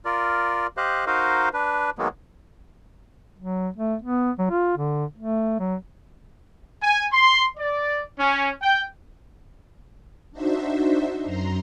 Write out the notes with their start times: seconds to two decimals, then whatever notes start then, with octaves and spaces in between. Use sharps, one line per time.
0.05 F4 A#4 D5
0.77 G4 C5 D#5 F5 F#6
1.07 D#4 F#4 A#4 C5 D#5 F5
1.53 D4 B4
1.98 D#3 F#3 G#3 A#3 B3
3.39 F#3
3.77 A3
4.02 B3
4.39 F#3
4.50 F4
4.77 D3
5.18 A3
5.59 F#3
6.82 G#5
7.12 C6
7.57 D5
8.19 C#4
8.62 G5
10.32 D4 D#4 F#4 C5 E5
11.25 F#2 A#5 C6